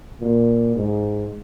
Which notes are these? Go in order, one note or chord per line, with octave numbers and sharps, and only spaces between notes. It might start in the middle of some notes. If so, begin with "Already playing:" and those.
A#2
G#2